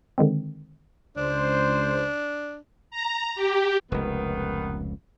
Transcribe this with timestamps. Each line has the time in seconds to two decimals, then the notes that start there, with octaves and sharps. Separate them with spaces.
0.18 D3 D#3 G#3 C4
1.17 C#2 D4 C5
2.91 A#5
3.35 G4
3.92 F1 C#2 D#3 B3